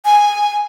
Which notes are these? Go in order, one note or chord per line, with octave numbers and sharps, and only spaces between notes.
G#5